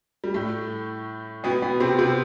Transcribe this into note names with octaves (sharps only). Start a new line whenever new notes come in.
G3
A2 A3
B2 B3
B2 B3
C3 C4
C3 C4